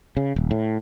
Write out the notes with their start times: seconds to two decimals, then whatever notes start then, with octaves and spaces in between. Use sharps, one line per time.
0.17 C#3
0.36 D#1
0.51 A2